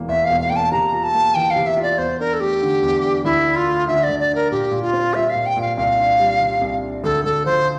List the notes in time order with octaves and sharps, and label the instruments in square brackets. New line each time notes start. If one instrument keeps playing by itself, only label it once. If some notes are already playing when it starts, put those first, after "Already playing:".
Already playing: [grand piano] E1 E3 A#3
[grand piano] E2 [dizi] E5
[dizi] F5
[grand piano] E1
[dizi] F5
[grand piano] A#3 [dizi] G5
[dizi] A5
[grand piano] C3 [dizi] A#5
[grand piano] F4
[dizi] A5
[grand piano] A#3
[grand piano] E3 [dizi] G5
[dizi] F5
[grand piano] C3
[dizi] E5
[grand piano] F4
[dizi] D5
[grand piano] E2 [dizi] C5
[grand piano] D4 [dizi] A#4
[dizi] A4
[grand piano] A3 [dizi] G4
[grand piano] D3
E2
D4
[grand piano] D2 [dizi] E4
[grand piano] D4
[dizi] F4
[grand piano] A3
[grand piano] D3 [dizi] E5
[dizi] D5
[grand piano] D2
[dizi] D5
[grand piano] D4
[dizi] A#4
[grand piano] A#2 [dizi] G4
[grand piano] A#2
[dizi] F4
[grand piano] C4
[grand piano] G3 [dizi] E5
[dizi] F5
[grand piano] A#2
[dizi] G5
[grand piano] A#2 [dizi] F5
[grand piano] C2 [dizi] F5
[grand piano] D4
G3
C3
C2
D4
[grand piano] D2 [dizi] A4
[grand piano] D2 [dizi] A4
[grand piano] F3 [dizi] C5